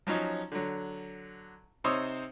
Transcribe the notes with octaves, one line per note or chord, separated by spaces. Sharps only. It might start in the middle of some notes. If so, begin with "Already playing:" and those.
F3 F#3 C#4 D#4
D3 F#3
C3 D#4 C5 C#5 D#6 E6